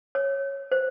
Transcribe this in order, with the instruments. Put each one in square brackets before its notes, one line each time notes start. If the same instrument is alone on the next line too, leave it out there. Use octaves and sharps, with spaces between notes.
[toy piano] C#5
C5